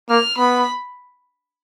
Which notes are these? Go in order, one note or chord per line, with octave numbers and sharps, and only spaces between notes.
A#3 F6
B3 B5